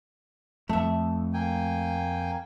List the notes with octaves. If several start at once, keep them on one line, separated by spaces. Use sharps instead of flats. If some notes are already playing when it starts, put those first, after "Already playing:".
F2 A3 E5
A#3 G5 G#5